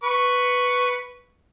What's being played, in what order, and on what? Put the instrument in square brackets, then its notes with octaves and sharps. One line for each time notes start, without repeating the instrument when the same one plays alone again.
[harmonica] B4 C#6